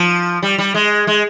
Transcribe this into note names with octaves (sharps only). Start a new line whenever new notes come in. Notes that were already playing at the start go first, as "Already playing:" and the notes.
Already playing: F3
G3
G3
G#3
G#3